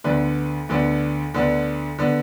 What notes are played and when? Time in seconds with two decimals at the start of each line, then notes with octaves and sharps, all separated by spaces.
0.04 D2 D3 B3 D4 B4
0.69 D2 D3 B3 D4
1.34 D2 D3 B3 D4
1.98 D3 B3 D4